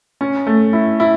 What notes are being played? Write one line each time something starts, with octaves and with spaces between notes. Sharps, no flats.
C#4
A3
E4
E4